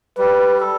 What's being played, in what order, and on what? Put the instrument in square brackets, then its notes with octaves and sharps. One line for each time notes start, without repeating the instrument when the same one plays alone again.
[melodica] G3 [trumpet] B4
[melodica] A4